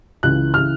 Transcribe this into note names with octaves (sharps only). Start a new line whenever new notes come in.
C#2 C#3 E3 F#6
C#3 E3 F6